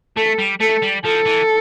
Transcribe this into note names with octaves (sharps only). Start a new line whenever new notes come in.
A3 A4
G3
A3 A4
G3
F3 A4
E3